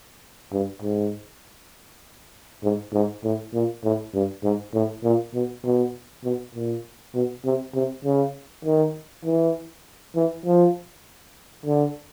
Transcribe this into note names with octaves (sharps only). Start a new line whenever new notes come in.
G2
G#2
G#2
G#2
A2
A#2
A2
G2
G#2
A2
A#2
B2
B2
B2
A#2
B2
C3
C3
C#3
D#3
E3
E3
F3
D3